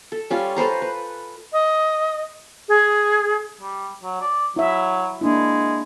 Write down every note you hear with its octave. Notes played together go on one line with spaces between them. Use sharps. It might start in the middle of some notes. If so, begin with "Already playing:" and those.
A4
G3 C#4 F4
A4 B4 C5 A#5
B4
D#5
G#4
G3
F#3
D5
F#3 E4 E5
G#3 A#3 D4 E4